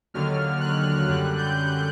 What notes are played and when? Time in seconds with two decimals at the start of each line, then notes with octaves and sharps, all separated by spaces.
0.14 D#2 D3 F#3 F6
0.61 F#6
1.08 F#2 D3 G3 F#6
1.38 G6